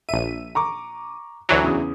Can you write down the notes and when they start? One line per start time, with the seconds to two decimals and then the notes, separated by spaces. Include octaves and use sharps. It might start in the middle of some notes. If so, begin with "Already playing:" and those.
0.09 A#1 E5 D#7
0.55 A#5 C#6 D6
1.49 D2 E3 F#3
1.63 E2 C#3 D#6